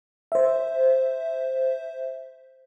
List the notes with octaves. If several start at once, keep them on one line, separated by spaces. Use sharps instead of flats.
C5 E5